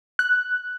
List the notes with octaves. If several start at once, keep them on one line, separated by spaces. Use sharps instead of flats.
F#6